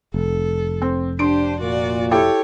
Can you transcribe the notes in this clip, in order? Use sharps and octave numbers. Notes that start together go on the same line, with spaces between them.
F1 A4
C4
D4 G4 C5 C6 D7
A#2 F#4 D5
E4 G4 A4 C#5